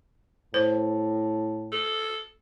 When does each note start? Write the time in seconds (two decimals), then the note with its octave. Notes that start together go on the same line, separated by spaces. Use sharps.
0.54 A2 C5
1.72 A4